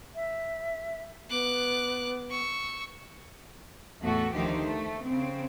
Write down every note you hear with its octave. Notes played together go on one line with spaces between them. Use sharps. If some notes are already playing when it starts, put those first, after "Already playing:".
E5
B3 D6 F#6
C#6 E6
E2 A2 A3 F#4 A4
D2 D#3 F3 D#4 G4 C5
A3
C#3 C4